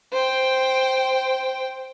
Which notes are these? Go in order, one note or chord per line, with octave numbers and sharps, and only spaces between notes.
C5 G5